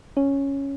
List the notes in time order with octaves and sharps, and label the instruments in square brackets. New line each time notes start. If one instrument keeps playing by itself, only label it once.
[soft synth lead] C#4